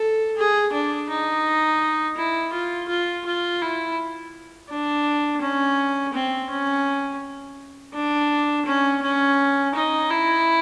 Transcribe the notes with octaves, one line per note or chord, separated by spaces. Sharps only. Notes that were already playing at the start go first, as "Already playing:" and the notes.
Already playing: A4
G#4
D4
D#4
E4
F4
F4
F4
E4
D4
C#4
C4
C#4
D4
C#4
C#4
D#4
E4